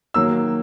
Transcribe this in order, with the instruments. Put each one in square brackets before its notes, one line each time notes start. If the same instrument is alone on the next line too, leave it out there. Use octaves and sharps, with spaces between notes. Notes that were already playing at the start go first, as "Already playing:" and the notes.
[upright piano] D#3 F#3 A#3 E6